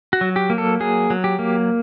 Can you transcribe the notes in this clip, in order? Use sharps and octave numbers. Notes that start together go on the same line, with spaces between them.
F#4
F#3
G4
A#3
A4
F#3 G#4
F#3
G4
A#3